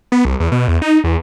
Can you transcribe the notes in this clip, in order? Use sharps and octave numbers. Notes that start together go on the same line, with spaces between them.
B3
C2
E2
B2
E2
D#4
E2